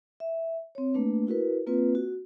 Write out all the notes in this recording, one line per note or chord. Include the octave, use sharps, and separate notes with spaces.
E5
C4 C#5
A3 A#3 D4 B4
E4 F#4 A#4 B4
A#3 C4 F4 B4
F#4